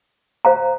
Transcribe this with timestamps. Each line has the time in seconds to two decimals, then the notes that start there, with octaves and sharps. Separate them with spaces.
0.45 C5 F5 A#5